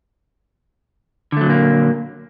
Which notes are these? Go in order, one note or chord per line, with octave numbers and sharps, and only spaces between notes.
A#2 D3 F#3 A3 A#3